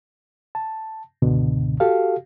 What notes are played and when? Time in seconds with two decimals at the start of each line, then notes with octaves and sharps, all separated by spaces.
0.55 A5
1.22 C#2 G#2 B2 D3
1.80 F#4 G4 A4 F5